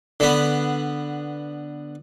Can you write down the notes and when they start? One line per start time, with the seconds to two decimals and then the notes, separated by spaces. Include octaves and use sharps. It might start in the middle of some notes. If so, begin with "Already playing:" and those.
0.20 D3 B3